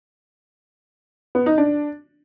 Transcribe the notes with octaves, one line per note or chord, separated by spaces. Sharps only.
B3
D#4
D4